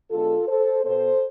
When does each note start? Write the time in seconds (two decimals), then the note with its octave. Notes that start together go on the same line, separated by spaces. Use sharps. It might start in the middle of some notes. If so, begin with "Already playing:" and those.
0.11 D3 G#3 B3 F4 A4
0.47 A4 C5
0.85 B2 B3 A4 C5